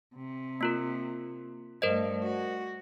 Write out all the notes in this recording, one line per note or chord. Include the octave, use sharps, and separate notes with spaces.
C3
A#3 F4 A#4
G2 A3 A#4 C5 D#5
F#4